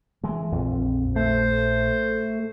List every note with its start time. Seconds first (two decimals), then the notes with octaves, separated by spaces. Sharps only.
0.24 E3 G#3
0.52 A#1 F2
1.16 A3 C5